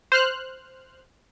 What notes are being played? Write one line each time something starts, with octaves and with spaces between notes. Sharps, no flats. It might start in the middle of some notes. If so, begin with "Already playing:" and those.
C5 F6 F#6